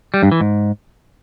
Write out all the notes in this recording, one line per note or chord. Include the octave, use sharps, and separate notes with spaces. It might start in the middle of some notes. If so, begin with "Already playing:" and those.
G3
G2
E3
G#2